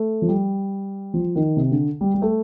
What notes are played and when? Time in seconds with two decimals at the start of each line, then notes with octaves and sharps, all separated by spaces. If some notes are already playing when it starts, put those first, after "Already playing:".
Already playing: A3
0.22 F3
0.28 G3
1.14 F3
1.36 D#3
1.57 C3
1.72 D3
2.01 G3
2.14 G3
2.22 A3